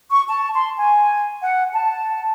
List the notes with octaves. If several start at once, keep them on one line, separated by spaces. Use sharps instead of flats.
C#6
A5
C6
G#5
F#5
A5